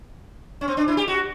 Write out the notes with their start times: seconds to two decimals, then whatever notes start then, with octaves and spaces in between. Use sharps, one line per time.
0.61 C#4
0.68 C4
0.77 D4
0.88 E4
0.97 G4
1.08 F#4